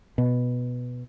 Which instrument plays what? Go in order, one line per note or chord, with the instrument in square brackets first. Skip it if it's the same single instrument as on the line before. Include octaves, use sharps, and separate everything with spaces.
[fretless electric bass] B2